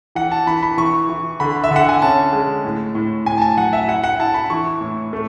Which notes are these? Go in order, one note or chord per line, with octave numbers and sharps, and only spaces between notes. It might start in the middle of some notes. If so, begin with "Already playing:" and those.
E3 F#5
A5
E3 B5
B5
E3 C#6
E3
D3 B5
E5
D3 F#5
G#5
C#4 A5
G#3
A2
A2
A2 G#5
A5
G#5
F#3 F#5
E5
E4 F#5
F#5
E4 A5
B5
E3 C#6
A2
A3